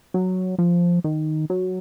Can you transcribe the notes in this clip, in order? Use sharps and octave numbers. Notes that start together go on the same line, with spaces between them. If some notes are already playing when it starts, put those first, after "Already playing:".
F#3
F3
D#3
F#3